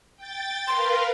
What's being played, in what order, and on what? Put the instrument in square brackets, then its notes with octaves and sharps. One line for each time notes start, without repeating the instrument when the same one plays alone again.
[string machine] G5 A6
[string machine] A#4 B4 F5 [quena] C6